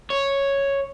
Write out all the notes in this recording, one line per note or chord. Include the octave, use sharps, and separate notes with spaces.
C#5